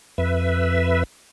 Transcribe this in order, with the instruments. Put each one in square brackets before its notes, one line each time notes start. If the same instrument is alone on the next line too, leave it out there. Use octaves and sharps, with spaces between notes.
[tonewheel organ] F2 B4 E5